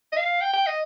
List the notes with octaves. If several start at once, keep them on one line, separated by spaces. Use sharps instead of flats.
D#5
F5
G5
G5
D#5